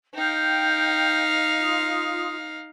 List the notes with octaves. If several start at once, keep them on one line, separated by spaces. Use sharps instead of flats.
D#4 F5 G5 G6
F4 D#6